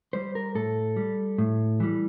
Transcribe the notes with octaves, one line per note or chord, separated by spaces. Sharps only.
G3 C5
A#4
A2 A4
G3
A2
E3 G3